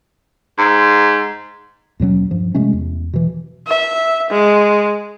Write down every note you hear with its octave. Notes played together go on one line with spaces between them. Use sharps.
G#2
D#2 B2 F#3 C#4
G2 F3
C3 G#3 A3 C#4
E2
B2 E3
E5
G#3